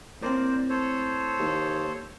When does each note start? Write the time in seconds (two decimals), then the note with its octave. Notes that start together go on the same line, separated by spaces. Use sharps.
0.22 A2 A#3 C4 A#4 C5 D5
0.70 A4 C5 C#5
1.39 D#2